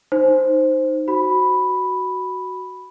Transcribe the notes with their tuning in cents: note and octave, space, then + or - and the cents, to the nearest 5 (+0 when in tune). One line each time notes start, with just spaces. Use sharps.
D#4 -5 C5 +0
F#4 +5 B5 +0